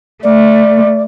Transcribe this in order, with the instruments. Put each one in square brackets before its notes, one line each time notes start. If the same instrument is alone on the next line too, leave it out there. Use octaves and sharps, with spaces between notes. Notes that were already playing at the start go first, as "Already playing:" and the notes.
[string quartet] A3 [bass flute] D5